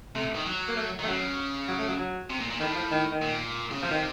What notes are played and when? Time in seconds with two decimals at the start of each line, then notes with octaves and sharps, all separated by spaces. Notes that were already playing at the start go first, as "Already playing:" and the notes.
0.15 C3 A3
0.36 D#3
0.46 F#3
0.68 A#3
0.77 A3
0.99 D#3
1.03 A3
1.07 C#3 F#3
1.68 F#3
1.78 A3
1.88 F#3
1.99 F#3
2.30 C3
2.40 A#2
2.50 A#2
2.60 A2 D#3
2.75 F3
2.91 D#3
3.11 D#3
3.22 A#2
3.71 C#3
3.82 C3 F3
3.91 D#3